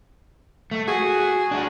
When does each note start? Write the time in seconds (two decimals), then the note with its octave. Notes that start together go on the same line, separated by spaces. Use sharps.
0.71 A3
0.88 F#4 G#4
1.51 D4 F#4